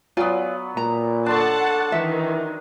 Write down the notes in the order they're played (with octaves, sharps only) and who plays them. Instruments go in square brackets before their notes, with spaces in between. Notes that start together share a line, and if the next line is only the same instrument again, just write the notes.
[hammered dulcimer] F#3 B3 [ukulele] F4 D5 G#5
[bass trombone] A#2 [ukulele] A#5
[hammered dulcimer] D4 C6 C#6 [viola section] A4 F#5 A5
[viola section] D#3 [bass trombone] E3 [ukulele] E5